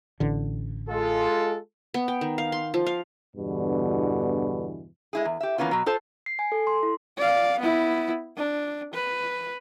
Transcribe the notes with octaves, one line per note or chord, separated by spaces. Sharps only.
A1 D3
G#3 F4 A4
B3
G5
D#3
F5
C6
F3
F5
E2 G2 B2 D3 E3
G#3 E4 G#4
E2
G4 E5
E3 A#3 B3 C#4 F4
B2 F#3
F4 A4 C5 A5
C7
G#5
A4
C6
E4
D5 F5
B3 E4
D4
B4